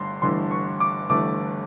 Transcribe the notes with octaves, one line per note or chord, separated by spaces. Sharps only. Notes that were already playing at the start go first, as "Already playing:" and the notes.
Already playing: G1 G2 A3 C6
G1 G2 E3 A3 C6
C#6
D6
G1 G2 E3 A3 D6